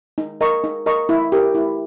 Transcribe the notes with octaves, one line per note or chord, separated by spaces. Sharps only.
D#4
A#4 D#5 A#5 C#6
D#4
A#4 D#5 A#5 C#6
E4
G4 A#4
E4